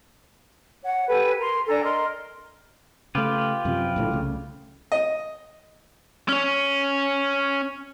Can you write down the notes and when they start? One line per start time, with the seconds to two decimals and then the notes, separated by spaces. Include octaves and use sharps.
0.82 C#5 F#5
1.07 G4 A4 B4 G#5
1.38 A#4 C6
1.67 D4 A4 G#5 A#5
1.83 A#4 D#5 C6
3.15 C#3 A3 F4 G4 B4
3.65 F#2 C3 F3
3.96 A#1 A2 D3
4.10 C2 C#3 A3
4.92 D#5
6.29 C#4 C#5